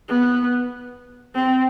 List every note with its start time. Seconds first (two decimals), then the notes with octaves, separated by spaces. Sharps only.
0.09 B3
1.36 C4